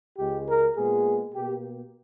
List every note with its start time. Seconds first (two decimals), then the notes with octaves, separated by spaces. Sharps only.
0.18 C#2 C#3 G#3 G4
0.48 A#4
0.76 A#2 G#3 B3 G#4
1.34 B2 A#3 G4